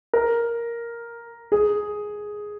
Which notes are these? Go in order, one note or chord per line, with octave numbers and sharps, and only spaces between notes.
A#4
G#4